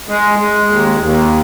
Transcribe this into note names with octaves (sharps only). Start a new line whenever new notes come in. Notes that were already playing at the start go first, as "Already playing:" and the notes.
G#3
G#3
D#2
D#2